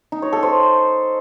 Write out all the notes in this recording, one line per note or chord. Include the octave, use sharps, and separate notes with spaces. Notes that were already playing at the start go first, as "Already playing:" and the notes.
D#4
C#5
A4
C5